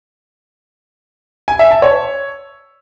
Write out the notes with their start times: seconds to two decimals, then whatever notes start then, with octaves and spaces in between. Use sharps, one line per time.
1.48 G#5
1.59 E5
1.71 A5
1.82 C#5